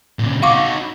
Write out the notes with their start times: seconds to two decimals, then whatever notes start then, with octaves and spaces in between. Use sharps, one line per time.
0.19 A#2 C#3
0.43 D#4 F#4 F5 C#6 D6